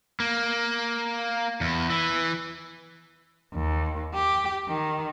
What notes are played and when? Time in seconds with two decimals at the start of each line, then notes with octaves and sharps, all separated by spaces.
0.20 A#3
1.61 E2
1.90 E3
3.54 D#2
4.14 G4
4.69 D#3